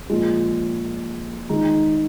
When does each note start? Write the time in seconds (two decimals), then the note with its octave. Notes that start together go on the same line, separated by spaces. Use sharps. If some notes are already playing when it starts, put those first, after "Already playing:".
0.10 A#2 F3 G#3
1.49 D#3 G#3 D#4